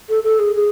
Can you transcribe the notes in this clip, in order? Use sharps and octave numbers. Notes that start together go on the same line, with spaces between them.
A4
A4
G#4
G#4